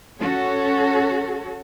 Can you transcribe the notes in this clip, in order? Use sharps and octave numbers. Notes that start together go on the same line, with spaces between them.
C#4 F#4 A4 C#5